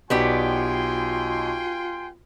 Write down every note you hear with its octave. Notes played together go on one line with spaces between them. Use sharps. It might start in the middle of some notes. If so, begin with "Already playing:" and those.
B1 B3 F4 G4 D5 G5 G#5 C6